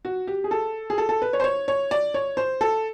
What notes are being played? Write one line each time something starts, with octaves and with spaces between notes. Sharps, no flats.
F#4
G4
G#4
A4
G#4
A4
A4
B4
C#5
C5
C#5
C#5
D5
C#5
C5
A4